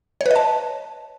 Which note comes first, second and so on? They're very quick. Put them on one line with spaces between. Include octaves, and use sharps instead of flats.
C#5 B4 D#5 A5